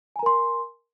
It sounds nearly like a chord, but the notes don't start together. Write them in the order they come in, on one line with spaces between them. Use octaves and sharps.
G#5 A#5 A#4 C6